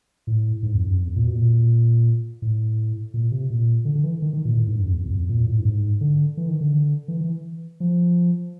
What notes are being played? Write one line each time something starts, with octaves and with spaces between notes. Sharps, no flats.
A2
G#2
F2
F#2
F2
E2
A#2
B2
A#2
A2
A#2
C3
A#2
D3
D3
E3
D#3
D#3
A#2
A2
G#2
G2
F#2
E2
F#2
F2
A#2
A2
G2
G#2
D3
E3
D#3
D3
E3
E3
F3